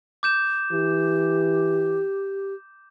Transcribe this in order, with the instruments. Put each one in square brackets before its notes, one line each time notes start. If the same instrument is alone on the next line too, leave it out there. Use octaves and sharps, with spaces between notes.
[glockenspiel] D6 G6 E7
[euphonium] E3 [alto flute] G4